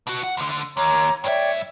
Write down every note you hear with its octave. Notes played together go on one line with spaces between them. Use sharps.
B2 F#4
F#5
D2 D3
D#2 C#5 A#5 D6
G2 C#5 D5 E5 G5